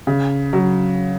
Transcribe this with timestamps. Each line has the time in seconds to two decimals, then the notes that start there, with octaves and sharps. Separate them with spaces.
0.07 C#3
0.53 F#3